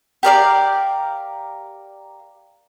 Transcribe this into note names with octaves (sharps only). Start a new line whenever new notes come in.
G4 A#4 D5 F5